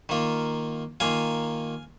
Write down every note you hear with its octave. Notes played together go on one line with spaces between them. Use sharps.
D#3 A#3 F4
D#3 A#3 F4 F5 G#5